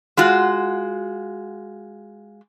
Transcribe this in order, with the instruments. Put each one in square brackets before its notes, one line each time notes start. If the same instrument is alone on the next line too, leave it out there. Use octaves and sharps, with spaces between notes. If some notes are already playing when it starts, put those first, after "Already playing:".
[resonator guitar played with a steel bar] G#3 F4 F#4